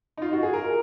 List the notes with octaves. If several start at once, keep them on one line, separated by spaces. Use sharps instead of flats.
D#4
F4
F#4
G#4
A#4